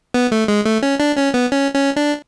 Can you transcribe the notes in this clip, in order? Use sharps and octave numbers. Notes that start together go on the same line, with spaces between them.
B3
A3
G#3
A3
C#4
D4
C#4
B3
C#4
C#4
D4